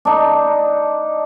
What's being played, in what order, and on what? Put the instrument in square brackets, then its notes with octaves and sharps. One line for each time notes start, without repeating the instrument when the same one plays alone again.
[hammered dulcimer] D4 D#4